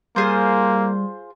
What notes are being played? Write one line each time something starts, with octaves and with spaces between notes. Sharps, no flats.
G3 A#3 F4 G#4 C5